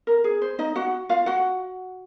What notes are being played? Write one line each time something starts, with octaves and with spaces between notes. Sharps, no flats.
A#4
G#4
C5
D#4 D#5
F#4 F#5
F4 F5
F#4 F#5